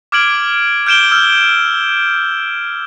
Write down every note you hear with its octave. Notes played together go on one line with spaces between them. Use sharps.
D6 F6 G#6 D7 F#7
F6 G6 D7 E7 G7
E6 F6 G6